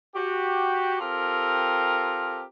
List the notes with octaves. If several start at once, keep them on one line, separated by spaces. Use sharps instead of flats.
F#4 G4
C4 F4 G4 A4 A#4